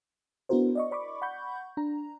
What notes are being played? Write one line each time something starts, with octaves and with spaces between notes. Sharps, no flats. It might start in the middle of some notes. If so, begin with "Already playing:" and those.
B3 D4 E4 F#4 A#4 C5
D5 D#5 C#6
D5 B5 C#6 D6
F#5 B5 C#6 G6
D4 A#5